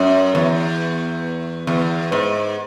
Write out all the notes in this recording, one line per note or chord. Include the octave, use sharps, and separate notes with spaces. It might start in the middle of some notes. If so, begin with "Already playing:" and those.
Already playing: F#2
E2
E2
G#2